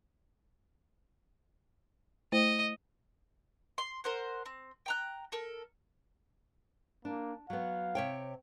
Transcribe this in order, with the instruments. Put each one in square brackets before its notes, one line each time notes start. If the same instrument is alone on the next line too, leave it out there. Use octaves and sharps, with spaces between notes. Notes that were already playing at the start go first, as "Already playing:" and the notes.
[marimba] A3 E4 C5 [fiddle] D#5
[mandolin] C6
A#4 C5 F#5
C4
G5 A#5 F#6
A4 A#4
[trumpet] A#3 [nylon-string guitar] D4
[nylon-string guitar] F#3 B3 [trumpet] F5
[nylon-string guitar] C3 C#5 G5